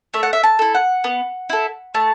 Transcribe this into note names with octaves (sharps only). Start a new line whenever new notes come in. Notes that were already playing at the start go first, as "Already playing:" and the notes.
A3 E5
F#5
E5
A5
E4 A4
F#5
B3
E4 A4
A3 A5